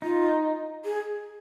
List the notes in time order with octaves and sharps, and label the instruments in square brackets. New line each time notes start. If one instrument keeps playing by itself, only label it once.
[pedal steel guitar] D#4 [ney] F4
[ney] G#4